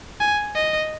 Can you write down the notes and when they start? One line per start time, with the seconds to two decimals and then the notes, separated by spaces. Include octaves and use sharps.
0.20 G#5
0.55 D#5